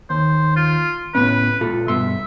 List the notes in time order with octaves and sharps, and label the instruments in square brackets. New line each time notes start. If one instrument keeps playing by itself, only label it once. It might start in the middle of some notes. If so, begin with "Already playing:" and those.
[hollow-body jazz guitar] D#2 [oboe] C5
[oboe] F4
[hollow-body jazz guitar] A2 B3 C#4 [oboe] B4
[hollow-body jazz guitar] A#2 F4 A4
[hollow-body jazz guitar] G2 B2 C6 [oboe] E5